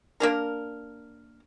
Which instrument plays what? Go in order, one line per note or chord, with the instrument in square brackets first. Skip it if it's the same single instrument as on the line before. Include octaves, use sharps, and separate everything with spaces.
[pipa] A#3 D4 A#4